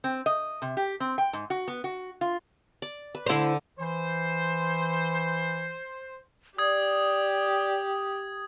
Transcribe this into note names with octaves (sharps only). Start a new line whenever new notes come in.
C4
D#5
C3
G4
C4
G5
G#2
F#4
B3
F#4
F4
D5
B4
D3 E4 C5 A#5
E3 C5
G4 D5 D#6 G#6